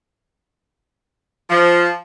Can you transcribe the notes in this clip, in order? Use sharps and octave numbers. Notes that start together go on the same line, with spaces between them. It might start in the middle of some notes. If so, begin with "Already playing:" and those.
F3